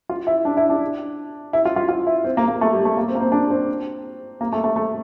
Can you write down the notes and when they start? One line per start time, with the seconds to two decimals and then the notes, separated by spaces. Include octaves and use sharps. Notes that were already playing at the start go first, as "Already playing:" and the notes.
0.09 F4
0.27 E4
0.45 D4
0.57 E4
0.69 D4
1.53 E4
1.65 F4
1.76 F4
1.89 F4
2.07 E4
2.24 C4
2.37 A#3
2.48 A#3
2.61 A3
2.73 G3
2.85 A3
2.97 A#3
3.08 C4
3.15 A#3
3.20 C4
3.32 D4
3.50 C4
4.41 A#3
4.52 A3
4.64 A3
4.76 A3